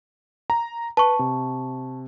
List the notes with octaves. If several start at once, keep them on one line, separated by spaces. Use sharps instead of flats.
A#5
B4 A5 C#6
C3